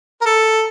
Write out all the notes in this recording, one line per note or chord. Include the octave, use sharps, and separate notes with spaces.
A#4
A4